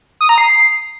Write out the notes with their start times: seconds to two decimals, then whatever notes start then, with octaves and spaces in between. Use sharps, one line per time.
0.21 D#6
0.29 A#5
0.38 C7